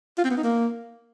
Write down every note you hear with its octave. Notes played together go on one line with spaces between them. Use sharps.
F4
C4
B3
D#4
A#3